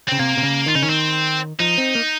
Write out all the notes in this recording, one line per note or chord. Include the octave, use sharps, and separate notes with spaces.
C#3 C4
C3 A#3
C3
C#3
D#3 F4
C#3 D#4
D#3 C#4
C4
F3 D#4
C4
A#3